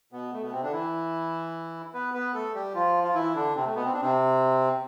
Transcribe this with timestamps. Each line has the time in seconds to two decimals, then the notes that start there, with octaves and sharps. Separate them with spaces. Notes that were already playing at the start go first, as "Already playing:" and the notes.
0.12 B2 B3
0.33 A3
0.43 B2 B3
0.52 C3 C4
0.63 D3 D4
0.72 E3 E4
1.94 B3 B4
2.14 B3 B4
2.34 A3 A4
2.54 G3 G4
2.75 F3 F4
3.04 F4
3.15 E3 E4
3.35 D3 D4
3.55 C3 C4
3.65 A3
3.75 B2 B3
3.85 C4
3.93 D4
4.01 C3 C4